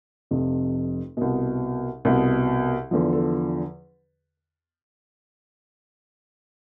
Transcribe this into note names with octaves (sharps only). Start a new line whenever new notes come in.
F1 F2 C3
C2 B2
C2 B2
E2 D3 F3
A4